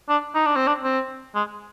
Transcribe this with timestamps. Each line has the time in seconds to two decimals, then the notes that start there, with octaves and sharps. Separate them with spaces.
0.09 D4
0.35 D#4
0.46 D4
0.56 C4
0.67 D4
0.84 C4
1.35 G#3